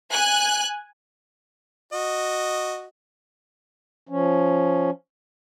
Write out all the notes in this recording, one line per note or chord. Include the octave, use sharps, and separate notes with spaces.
G#5 F#6
F#4 D#5
F3 C#4